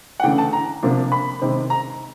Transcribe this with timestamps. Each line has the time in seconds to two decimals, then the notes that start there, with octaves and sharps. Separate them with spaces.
0.20 F#5
0.23 C#3 E3 A3 D4 G5
0.38 A5
0.53 A#5
0.83 C3 F3 A#3 D4
1.12 B5
1.41 C3 D#3 G#3 C4
1.70 A#5